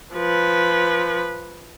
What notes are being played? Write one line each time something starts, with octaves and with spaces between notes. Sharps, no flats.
F3 B4